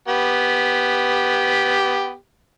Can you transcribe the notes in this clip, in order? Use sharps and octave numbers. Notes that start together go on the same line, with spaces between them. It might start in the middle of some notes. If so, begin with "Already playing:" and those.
B3 G4